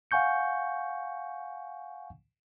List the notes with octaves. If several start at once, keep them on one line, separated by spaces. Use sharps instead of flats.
F5 F#5 G#5 C#6 G6 C#7